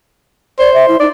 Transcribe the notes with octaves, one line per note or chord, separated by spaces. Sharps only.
C5 D5
E5
E4
D#4 D5